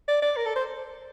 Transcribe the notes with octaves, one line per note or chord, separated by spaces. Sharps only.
D5
D5
A#4
A4
C5